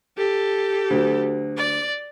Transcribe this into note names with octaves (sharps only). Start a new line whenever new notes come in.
G4 A4
D2 F#3
D5